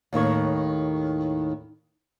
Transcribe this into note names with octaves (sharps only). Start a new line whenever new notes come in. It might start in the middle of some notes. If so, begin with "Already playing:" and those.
D#2 A2 D#3 C#5